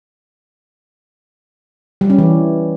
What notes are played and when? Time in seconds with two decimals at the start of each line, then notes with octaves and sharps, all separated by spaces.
2.01 G3
2.10 C#4
2.18 E3